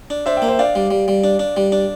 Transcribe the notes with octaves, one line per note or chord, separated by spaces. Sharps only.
D4
D4 C5 E5
E5 G5
A#3
C5 E5
D4 D5 F5
G3
G3
G3
D4
D4
G3
D4